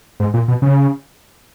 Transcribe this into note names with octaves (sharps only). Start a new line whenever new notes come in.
G#2
A#2
B2
C#3